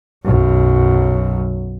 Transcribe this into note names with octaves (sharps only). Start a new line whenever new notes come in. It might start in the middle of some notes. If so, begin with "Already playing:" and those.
B1 F#2